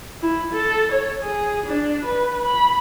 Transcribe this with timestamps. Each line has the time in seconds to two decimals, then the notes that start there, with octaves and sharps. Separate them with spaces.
0.22 E4
0.53 A4
0.92 C#5
1.22 G#4
1.66 D4
2.05 B4
2.45 B5